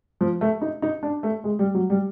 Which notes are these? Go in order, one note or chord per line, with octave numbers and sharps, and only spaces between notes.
F3
A3
D#4
D#4
D4
A3
G#3
G3
F#3
G3